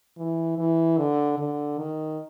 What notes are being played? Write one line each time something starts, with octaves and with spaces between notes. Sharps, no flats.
E3
E3
D3
D3
D#3